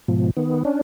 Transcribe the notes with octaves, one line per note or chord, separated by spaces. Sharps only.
G#2 B2 F3
D#3 B3
C#4 D4